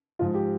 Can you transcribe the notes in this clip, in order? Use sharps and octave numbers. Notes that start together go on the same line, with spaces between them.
G#2 F3 F4
G4